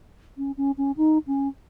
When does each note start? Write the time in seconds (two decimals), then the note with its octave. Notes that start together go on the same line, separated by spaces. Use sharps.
0.38 C#4
0.57 C#4
0.78 C#4
0.97 D#4
1.27 C#4